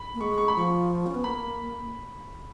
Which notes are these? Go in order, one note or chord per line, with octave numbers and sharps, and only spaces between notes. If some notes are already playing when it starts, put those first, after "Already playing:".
Already playing: B5
A#3
G#3 C#6
C#6
B5
F3 C#6
C#4
B3
A#3 B5